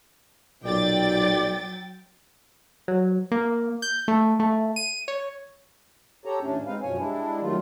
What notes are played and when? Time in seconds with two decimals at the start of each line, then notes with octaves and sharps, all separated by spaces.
0.64 B1 A#2 F#3 D5 G5 A6
2.88 F#3
3.31 A#3
3.82 G6
4.08 A3
4.40 A3
4.76 D#7
5.08 C#5
6.25 G4 A4 C#5 A#5
6.42 D#2 A2 A3 C#4 D4
6.66 G#3 C4 D#4 B4 F5
6.82 F#2 B2 F3 C#4 C#5 G#5
6.97 G3 G#3 D4 E4
7.41 D#3 F#3 G3 A3 F4